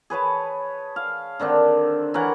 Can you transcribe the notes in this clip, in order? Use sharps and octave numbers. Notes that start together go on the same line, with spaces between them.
G#4 B4 C#5 A5
F5
D3 D#3 C4 D4
E3 A#4 C#5 F#5